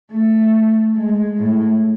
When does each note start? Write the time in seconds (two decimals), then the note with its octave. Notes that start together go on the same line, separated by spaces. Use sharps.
0.12 A3
0.96 G#3
1.38 A2